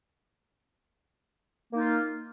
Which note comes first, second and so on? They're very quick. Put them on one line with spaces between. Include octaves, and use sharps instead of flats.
A#3 D#4 F4